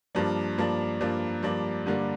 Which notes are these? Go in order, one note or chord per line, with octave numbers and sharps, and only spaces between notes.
G2 F3 A#3 D4
G2 F3 A#3 D4
G2 F3 A#3 D4
G2 F3 A#3 D4
G2 D3 G3 A#3 D4